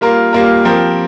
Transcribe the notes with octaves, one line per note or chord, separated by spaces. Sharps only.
G3 A#3 F4 A#4
G3 A#3 F4 A#4
F3 C4 G4 A#4